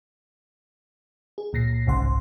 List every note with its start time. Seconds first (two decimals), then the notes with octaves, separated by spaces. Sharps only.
1.38 G#4
1.53 C#2 A#2 A#6 C7
1.87 G1 C2 G#2 C#3 F#5 C6